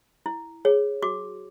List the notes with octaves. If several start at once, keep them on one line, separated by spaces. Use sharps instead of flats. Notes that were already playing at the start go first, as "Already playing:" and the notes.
E4
G#4 C#5
F#4 D6